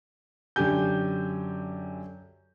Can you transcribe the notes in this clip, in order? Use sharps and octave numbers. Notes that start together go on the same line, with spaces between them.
F#2 D3 G4 G#5 G6